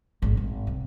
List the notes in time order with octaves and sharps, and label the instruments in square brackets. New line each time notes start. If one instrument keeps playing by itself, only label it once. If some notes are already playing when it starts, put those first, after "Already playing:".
[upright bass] G#1 C#4
G#1
C3